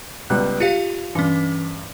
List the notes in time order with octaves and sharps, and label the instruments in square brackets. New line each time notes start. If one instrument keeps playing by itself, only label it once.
[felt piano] C#2 G3 B3 [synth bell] F#6
[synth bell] F4 G4 F5 [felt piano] C#7
[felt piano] G2 [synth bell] E3 C#4